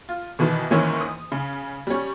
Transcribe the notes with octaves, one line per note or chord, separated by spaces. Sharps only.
F4
B2 D#3 E3 B4
G#2 D#3 E3 A#3 C#4 E4
D#6
C#3
G3 C#4